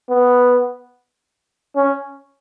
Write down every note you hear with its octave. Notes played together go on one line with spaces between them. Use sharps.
B3
C#4